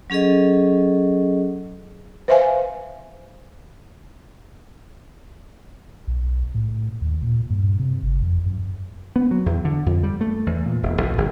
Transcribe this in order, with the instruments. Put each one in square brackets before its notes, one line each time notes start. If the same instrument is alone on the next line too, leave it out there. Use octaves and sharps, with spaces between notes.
[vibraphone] F#3 C#4 G#4 A4 D#5
[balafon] B4 C5 E5 F5 G#5
[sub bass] B1
A2
D#2
A#2
G2
C3
G1
F2
F#2
[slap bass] B3
F#3
E2
D3
F2
G3
A3
E2
A#2
E1
B1
G1